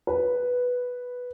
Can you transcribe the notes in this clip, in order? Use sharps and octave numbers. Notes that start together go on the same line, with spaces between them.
B4